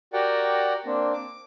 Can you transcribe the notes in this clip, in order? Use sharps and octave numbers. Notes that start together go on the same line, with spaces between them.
F#4 G4 A#4 D5 F#5 G5
A#3 C4 D4
D6